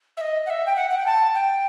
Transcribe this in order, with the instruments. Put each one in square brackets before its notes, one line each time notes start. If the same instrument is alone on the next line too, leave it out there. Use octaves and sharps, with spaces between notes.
[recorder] E5
D#5
F#5
E5
G5
F#5
F#5
G5
A5
G5